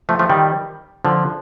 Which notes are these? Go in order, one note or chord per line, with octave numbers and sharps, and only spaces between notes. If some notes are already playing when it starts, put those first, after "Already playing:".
F3 A3
F3 A3
D#3 G3
D3 F3